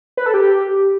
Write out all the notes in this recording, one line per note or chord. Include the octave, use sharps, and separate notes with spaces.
B4
A4
G4